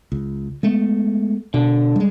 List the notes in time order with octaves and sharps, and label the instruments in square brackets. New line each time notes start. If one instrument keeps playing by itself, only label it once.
[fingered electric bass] C#2
G#3 A3 B3
[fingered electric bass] B2 [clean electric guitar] D3
[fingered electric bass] G3 G#3